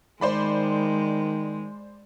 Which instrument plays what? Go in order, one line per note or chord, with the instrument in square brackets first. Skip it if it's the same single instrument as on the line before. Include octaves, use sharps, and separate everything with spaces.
[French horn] D#3 [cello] G#3 [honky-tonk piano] C5 D5 B5